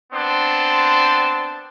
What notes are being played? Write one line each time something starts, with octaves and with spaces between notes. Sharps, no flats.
B3 C4 D4 A5 C6